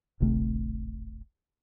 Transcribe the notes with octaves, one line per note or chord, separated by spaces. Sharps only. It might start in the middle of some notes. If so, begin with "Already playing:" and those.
D1 G#1 C3 A3